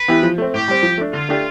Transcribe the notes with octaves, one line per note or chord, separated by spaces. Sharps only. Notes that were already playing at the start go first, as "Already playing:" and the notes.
Already playing: B4
E3 B3 E4 G4
F3
A3 C4
A2 G4
G3 C4
F3
A3 D4
D3 F4
A3 D4 G4